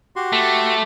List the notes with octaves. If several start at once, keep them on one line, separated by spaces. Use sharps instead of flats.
F#4 G4 C6
A3